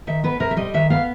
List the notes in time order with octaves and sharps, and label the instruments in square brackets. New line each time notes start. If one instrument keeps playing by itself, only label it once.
[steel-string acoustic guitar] D#3 E5
B3 B4
C3 A#4
E5
G3 D#5
D#3 E5
B3 F5